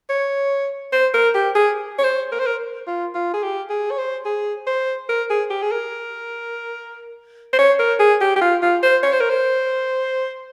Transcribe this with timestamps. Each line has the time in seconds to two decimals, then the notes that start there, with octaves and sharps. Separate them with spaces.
0.09 C#5
0.92 C5
1.14 A#4
1.34 G4
1.55 G#4
1.98 C#5
2.04 C5
2.32 A#4
2.39 C5
2.46 A#4
2.87 F4
3.15 F4
3.34 G#4
3.43 G4
3.70 G#4
3.91 C#5
3.98 C5
4.25 G#4
4.67 C5
5.09 A#4
5.30 G#4
5.50 G4
5.62 G#4
5.72 A#4
7.53 C5
7.58 C#5
7.79 A#4
8.00 G#4
8.21 G4
8.36 G4
8.41 F4
8.62 F4
8.83 C5
9.03 C#5
9.13 C5
9.20 A#4
9.29 C5